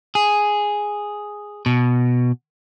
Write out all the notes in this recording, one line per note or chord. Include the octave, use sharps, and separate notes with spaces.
G#4
B2